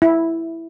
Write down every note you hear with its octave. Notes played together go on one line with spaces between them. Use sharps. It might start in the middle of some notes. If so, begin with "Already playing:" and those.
E4